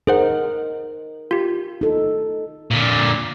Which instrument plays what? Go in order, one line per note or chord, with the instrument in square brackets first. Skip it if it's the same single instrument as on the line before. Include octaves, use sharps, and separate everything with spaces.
[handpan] D#4 A#4 [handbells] G#4 C5 F#5
[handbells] F4 G4
[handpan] D#4 A4
[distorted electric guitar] A#2 D3